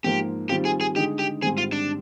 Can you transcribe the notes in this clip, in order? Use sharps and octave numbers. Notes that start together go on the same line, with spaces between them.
G#2 F3 A#3 G4
D#3 G3 C4 F4 G4
G#4
G#4
D3 G#3 D#4 G4 G#4
G4
G#2 D#3 G3 C4 G#4
F4
D4